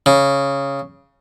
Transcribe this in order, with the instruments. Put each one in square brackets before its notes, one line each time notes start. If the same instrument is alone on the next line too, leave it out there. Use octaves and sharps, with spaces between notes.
[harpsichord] C#3